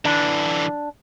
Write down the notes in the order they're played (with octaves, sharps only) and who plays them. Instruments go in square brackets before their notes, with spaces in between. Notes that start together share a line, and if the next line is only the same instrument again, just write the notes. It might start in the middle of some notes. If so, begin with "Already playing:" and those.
[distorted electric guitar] D3 E3 [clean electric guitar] D4